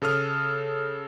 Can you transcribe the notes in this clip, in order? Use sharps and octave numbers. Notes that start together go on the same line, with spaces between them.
C#3 A4 D#6 F6